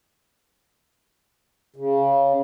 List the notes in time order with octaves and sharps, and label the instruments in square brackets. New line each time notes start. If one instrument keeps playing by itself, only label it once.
[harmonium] C#3